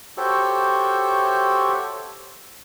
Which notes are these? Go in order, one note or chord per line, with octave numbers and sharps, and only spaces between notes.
F#4 G4 A4 C5 C#5 E5